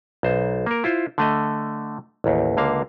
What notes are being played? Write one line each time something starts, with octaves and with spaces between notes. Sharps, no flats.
B1 C5
A#3 A#4
E4 F4 C5
D3 A3 D#5
A1 D#2
C#2 D3 A#3 F5